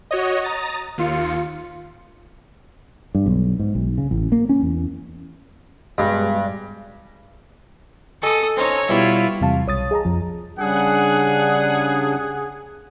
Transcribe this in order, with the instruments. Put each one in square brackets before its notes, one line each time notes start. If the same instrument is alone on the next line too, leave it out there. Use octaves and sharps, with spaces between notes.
[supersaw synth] F#4 C#5 D#5
A#5 D#6 A6
D#2 F4 C#7
[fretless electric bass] G2
B1
G#2
B1
C#3
A1
A#3
C#4
E2
[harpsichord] G2 [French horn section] B2 G3 G#3
[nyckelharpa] A4 D#6 [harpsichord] D#5 G#5 C#6
[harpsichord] C4 C#4 D#4 [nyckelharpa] C#5 [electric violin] A#5
[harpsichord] B2 G3 [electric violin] E4 F4
[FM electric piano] E2 C3 G3 F5 A5
B1 C#5 D#6 A6
G#4 D#5 A5 A#5
F2 F3
[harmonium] C#3 G3 D4 [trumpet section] G#4 F#5